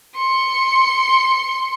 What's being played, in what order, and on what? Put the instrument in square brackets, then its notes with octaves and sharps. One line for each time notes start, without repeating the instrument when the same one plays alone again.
[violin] C6 C#7